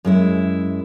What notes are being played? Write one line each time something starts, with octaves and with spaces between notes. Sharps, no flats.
F#2 G#3 E4